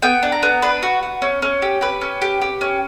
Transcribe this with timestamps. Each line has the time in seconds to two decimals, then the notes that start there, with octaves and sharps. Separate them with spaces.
0.02 B3 G5
0.23 D4
0.32 A#5
0.43 B3
0.62 D4 B4
0.83 F#4
1.03 F#4
1.22 C#4
1.42 C#4
1.62 G4
1.81 G4 B4
2.01 C#4
2.22 G4
2.41 G4
2.61 C#4